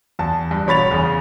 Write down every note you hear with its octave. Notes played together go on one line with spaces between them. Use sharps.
E2 A5
G2
E1 C#5 B5 A6 F7
E2 C#3